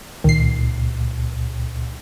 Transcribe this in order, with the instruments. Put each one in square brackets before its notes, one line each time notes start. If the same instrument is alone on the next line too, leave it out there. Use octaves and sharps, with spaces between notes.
[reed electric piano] C#2 A#2 [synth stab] D#3 C7